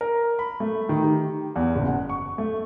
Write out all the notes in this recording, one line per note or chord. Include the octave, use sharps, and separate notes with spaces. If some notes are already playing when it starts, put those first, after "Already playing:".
A#4
B5
A3
D#3
G4
E2
F#1
F#5
C#6
A3